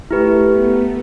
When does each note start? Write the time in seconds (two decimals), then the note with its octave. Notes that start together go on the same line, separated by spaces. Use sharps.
0.11 A3 E4 G4 B4
0.52 B3